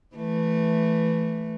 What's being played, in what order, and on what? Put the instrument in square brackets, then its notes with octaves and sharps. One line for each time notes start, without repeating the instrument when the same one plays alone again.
[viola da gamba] E3 A3